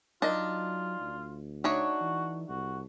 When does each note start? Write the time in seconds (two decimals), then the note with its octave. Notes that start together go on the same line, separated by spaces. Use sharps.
0.22 F#3 D4 D#4 F4 D#5
1.00 D2
1.64 A3 D4 D#4 F#4 C#5
2.01 E3
2.49 C2 F#4